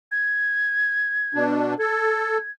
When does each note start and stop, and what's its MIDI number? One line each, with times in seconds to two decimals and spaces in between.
0.12 1.45 92
1.34 1.74 47
1.34 1.74 62
1.79 2.38 69
1.79 2.51 92